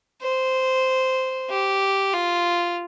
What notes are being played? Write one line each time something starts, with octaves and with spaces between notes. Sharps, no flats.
C5
G4
F4